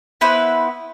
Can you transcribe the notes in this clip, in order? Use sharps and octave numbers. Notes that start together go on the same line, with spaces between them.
B3 E4 B4 C5